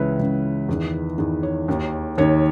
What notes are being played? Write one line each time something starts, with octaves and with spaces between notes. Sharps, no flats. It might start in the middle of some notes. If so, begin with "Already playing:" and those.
Already playing: C#2 C#3 E3 B4 C#5
C#2 C#3 E3
E2 D#3
E2 D#3
C#5
D#2 D#3
D#2 D#3 C#5